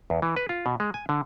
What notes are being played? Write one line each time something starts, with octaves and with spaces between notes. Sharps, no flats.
E2
E3
B4
F4
B2
G#3
G#5
D3